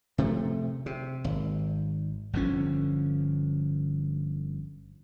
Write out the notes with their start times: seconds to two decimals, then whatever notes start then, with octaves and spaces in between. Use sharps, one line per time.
0.18 C3 F3 A3
0.86 C3
1.24 G#1
2.33 G1 D3 F3 C#4